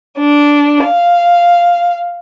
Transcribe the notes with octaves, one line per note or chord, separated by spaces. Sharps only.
D4
F5